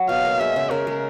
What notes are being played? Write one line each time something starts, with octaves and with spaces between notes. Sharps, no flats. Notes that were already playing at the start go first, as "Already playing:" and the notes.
Already playing: F#3
B2 F5
A#3
G#3 E5
C#3
C#3 A#4
G#3